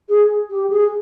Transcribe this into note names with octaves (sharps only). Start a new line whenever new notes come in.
G#4
G4
G#4